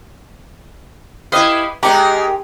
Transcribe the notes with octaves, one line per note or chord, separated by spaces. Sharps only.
E4 G4 B4 D#5 F5
G#3 D#4 G4 A#4 D5 A#5 D6